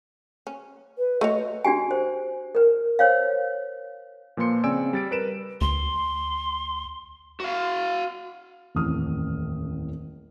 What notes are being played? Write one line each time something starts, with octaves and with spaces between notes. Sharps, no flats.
C#4
B4
A3 F#4 C#5 D#5
D4 F#4 G4 G#5
C5
A#4 B4
C5 C#5 F5
A#2 F3 A#3 B4 C6 C#7
C#3 C4 D5 G#5 E6 D7
G3 A6 D7
A#4 B4 D7 E7
D2 C6
F#4 F5
D#1 A1 F2 A2 D#6 F6